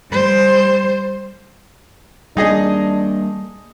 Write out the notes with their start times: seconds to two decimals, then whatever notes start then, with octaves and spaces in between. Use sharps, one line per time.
0.11 G3 C5
2.37 G3 A#3 D4 D#4 G#4 D#5